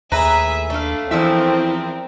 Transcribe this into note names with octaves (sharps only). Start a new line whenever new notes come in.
D#2 A2 G#4 B4 E5 A#5
A3 D4 F5
E2 F3 C4 E4 A#4 E5